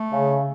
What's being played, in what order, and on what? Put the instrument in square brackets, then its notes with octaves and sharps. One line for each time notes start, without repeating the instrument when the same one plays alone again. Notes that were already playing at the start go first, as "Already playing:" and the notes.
Already playing: [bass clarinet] A3
[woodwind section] C#3